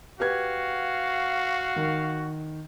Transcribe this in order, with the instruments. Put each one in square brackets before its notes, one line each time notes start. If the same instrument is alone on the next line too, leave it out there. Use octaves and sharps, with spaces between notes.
[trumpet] F#4 [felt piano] G4 B4 G#6 [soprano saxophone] F5
[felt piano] D#3